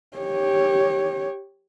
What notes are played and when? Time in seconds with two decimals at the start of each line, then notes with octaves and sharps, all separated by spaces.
0.17 G4 C#5